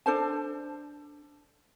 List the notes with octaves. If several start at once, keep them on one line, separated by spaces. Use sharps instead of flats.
D4 A4 C5 A5